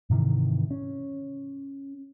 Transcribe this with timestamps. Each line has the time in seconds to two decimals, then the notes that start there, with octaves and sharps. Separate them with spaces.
0.10 G#2 C3 D#3 E3
0.71 C#4